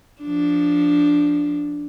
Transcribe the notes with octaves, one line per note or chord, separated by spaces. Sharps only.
F3 D4